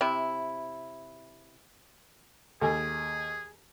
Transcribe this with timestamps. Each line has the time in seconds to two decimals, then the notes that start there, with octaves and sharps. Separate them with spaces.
0.01 C3 E4
2.61 D#2 G#4 A4 G#5